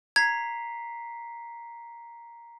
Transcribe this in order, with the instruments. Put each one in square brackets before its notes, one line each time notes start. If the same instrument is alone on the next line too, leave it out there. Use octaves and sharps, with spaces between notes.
[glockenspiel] A#5 B6 C7 [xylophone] G#6